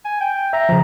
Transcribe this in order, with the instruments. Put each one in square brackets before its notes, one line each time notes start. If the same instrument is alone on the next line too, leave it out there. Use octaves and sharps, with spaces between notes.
[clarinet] G#5
G5
[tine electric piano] E5 [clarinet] A#5
[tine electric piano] C#3 F3